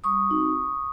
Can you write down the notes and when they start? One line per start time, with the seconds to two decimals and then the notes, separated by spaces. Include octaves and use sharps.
0.04 G3 C#6 D#6
0.29 C4 D#4 F#4